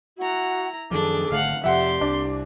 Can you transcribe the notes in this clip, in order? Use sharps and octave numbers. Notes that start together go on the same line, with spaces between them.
E4 F#4 F#5 A#5
F#2 D#3 F3 D4 G#4 A4 D6
G#1 D3 A3 F5 F#5
F2 C3 F3 G4 D5 E5 F#5 C6
C2 D4 D6